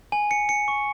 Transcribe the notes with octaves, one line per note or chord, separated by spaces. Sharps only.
G#5
C#7
C#7
C#6